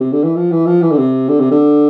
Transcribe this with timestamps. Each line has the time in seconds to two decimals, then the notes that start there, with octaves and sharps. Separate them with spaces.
0.01 C3
0.13 D3
0.24 E3
0.37 F3
0.52 E3
0.66 F3
0.82 E3
0.91 D3
0.98 C3
1.29 D3
1.40 C3
1.51 D3